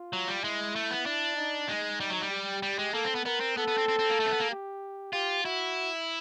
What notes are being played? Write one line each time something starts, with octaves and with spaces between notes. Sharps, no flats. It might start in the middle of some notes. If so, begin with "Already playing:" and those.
Already playing: F4
F#3
G3
G#3 E4
A3
B3
D4
D#4
G#3 D#4
G3
F#3
G3
G4
G3
G#3
A#3 A4
C4
B3
B3 A#4
C4
B3 A4
B3
C4
C4
C4
A#3
A3
C4
B3
A#3
G4
F4 G4
E4 F#4